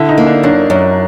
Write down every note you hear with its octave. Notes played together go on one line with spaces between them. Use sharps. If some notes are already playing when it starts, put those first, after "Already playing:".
Already playing: D3 E4
D#4
A#3
D4
F#2 D4
F#2